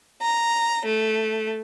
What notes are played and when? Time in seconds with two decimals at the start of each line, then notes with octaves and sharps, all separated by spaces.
0.22 A#5
0.86 A3